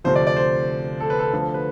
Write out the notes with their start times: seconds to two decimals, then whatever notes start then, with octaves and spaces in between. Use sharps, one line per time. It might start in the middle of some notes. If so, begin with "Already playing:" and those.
0.04 D2 C3 F3 C5
0.16 D5
0.27 D5
0.37 C5
1.00 A4
1.10 B4
1.19 A4
1.32 D2 D3 F3
1.54 B4